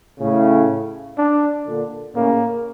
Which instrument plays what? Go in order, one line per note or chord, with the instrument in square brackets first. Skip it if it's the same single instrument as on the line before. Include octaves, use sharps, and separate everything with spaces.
[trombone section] A2 C#3
[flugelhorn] D4
[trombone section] A#2 D3
[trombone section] A2 C#3 [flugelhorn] A#3